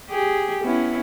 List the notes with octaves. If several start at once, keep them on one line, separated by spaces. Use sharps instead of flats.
G4 G#4
B3 C#4 E4